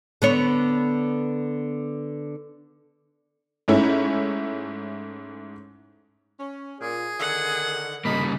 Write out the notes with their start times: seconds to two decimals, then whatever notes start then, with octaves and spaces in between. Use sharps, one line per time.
0.22 D3 B3 C#5
3.68 G#2 A3 C#4 E4
6.39 C#4
6.81 A#2 G#4
7.20 D3 D#3 F#5
8.05 C#3 G3 A#3 D#4 B5